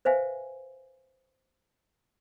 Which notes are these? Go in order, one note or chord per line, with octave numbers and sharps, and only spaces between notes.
B4 C5 E5 F5 G#5